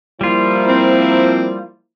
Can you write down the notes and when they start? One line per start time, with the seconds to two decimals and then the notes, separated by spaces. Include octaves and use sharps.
0.21 F3 G3 A#3 E4 F4
0.68 C4